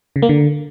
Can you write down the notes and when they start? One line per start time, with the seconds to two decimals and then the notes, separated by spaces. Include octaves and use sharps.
0.16 C#3
0.22 A#3
0.29 D3